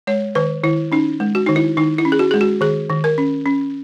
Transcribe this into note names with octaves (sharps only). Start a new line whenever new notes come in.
G#3 C#5
D#3 B4
D#3 E4
C#4 D#4
G#3
F#4
D#3 D#4
E4
D#3 D#4
E4
C#4
G#4
F#4
G#3 G#4
F#4
D#3 G#4
D#3
A#4
C#4
C#4